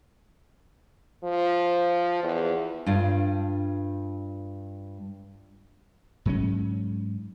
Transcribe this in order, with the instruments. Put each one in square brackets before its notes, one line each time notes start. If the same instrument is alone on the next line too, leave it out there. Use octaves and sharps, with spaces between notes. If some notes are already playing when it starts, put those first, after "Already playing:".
[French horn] F3
E2
[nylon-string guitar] G2 F4
[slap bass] G#2 F#3 C#4